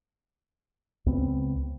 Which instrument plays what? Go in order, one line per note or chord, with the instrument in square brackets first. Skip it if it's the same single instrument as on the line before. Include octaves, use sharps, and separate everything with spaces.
[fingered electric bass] C#2 C#3 B3 C4